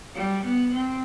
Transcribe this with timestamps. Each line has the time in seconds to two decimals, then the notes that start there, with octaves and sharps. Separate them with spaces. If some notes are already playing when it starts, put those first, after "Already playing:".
0.15 G3
0.44 B3
0.75 C4